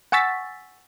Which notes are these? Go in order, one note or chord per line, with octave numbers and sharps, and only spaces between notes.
F#5 G#5 C#6 E6 A6 B6